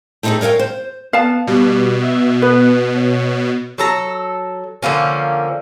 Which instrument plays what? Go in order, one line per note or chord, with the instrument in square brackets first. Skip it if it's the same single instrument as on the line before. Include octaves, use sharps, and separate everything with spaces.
[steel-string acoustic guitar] A3 C4 D#4 F4 G#4 A4
A#4 C#5 D#5 F5 G5
C5
[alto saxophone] B3 [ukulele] F5 A5
[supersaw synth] B2 [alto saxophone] G3
[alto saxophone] E5
[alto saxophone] B3 [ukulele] B4
[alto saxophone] C#5
[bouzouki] F#3 A4 A#5
D3 F3 A#3 C#4